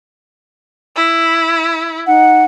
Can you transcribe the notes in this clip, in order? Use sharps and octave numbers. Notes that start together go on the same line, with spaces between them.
E4
D#4 F#5